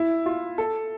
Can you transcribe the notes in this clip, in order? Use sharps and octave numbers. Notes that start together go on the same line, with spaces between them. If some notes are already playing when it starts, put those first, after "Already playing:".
Already playing: E4
F4
A4